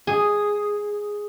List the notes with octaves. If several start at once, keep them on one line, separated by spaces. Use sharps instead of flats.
G#4